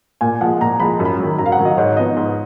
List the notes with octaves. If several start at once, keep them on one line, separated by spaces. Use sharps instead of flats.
A#2 G#5
F3 G#3 F#5
A#2 A#5
F3 G#3 B5
F#2
B5
D#3 F#3
F#2 A#5
F5
F#5
D#3 F#3
D#5
G#2 C#5
F3 B3 D#4 D#5
G#2